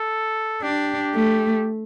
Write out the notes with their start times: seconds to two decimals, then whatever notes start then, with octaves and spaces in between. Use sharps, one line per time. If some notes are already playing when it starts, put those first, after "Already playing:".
Already playing: A4
0.62 D4 G4
1.14 A3